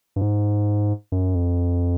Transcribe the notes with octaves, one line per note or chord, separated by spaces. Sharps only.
G2
G#2
F#2
F2